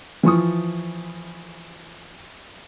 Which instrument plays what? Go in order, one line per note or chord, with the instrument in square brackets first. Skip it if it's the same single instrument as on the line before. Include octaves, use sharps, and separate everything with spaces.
[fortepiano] E3 F3 C#6 D#6